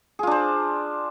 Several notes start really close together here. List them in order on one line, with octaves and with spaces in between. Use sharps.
G#4 F4 D4 C5